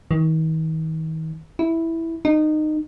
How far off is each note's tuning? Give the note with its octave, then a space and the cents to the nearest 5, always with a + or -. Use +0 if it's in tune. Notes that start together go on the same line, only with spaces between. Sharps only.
D#3 +40
E4 -5
D#4 -20